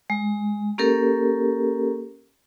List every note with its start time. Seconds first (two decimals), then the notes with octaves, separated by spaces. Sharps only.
0.10 G#3
0.78 A#3 C#4 G4 A4 A#4